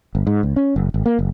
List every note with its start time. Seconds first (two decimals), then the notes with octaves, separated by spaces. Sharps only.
0.15 G1
0.27 G#2
0.43 C#2
0.56 C#4
0.76 F#1
0.94 G#1
1.06 A#3
1.19 F#1